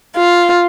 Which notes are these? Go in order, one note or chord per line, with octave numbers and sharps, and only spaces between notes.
F4